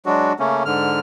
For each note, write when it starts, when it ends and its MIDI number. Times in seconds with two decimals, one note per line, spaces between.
0.06 0.33 54
0.06 0.33 56
0.06 0.33 62
0.06 0.33 66
0.39 0.63 49
0.39 0.63 57
0.39 0.63 58
0.39 0.63 61
0.65 1.00 44
0.65 1.00 50
0.65 1.00 89